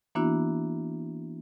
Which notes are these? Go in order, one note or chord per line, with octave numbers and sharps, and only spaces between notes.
E3 A#3 B3 D4 E4 F#4